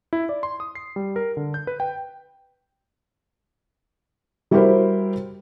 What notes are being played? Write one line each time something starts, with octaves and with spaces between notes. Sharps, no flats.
E4
D5
C6
D#6
C7
G3
A#4
D3
G6
B4
G5
G3 E4 F#4 G4 A#4 C5